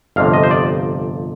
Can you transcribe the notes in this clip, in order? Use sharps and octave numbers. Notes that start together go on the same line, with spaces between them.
G1 F2 C3 F5
D#5
C5
D5